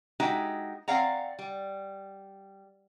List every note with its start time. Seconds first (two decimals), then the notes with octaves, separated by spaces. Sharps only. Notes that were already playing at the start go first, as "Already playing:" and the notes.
0.20 G#3 D#4 F#4 G4 E5
0.88 C4 C#5 D5 F5 F#5 A#5
1.39 G3